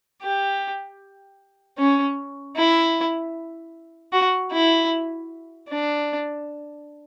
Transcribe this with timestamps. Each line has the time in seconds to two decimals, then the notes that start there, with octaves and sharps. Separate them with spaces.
0.23 G4
1.78 C#4
2.56 E4
4.13 F#4
4.52 E4
5.69 D4